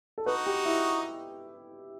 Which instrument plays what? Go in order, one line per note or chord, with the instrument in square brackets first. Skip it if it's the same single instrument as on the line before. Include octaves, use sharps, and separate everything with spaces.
[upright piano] A4
[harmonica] D#4 F#4 [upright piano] B4
[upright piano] G4
E4